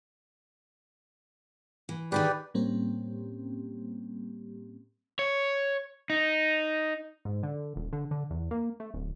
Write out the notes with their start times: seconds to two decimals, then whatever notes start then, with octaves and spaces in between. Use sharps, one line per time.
1.89 E3
2.12 D#3 D#4 G4 G#4 B4 D5
2.54 A2 G3 A#3 C4 C#4 G4
5.19 C#5
6.10 D#4
7.25 G#2
7.43 D3
7.76 D#1
7.93 D3
8.11 D3
8.30 E2
8.51 A#3
8.80 A3
8.94 D1